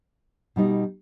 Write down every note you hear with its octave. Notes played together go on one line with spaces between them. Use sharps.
B2 G3 B3 D#4